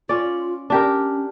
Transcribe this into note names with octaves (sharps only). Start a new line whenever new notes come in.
C#4 F4 D5
C#4 D4 G4 A#4